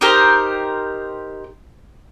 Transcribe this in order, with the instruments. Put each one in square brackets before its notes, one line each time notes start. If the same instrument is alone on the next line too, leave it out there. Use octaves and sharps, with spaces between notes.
[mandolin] D#4 G4 A#4 C5